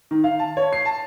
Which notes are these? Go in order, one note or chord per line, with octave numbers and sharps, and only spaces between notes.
D#3
F5
A5
C#5
C7
A5